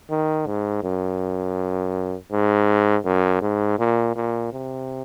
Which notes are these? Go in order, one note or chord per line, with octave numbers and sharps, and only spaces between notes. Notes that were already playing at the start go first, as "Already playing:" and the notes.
D#3
G#2
F#2
G#2
F#2
G#2
A#2
A#2
C3